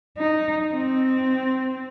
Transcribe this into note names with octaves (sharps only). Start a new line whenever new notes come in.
D#4
C4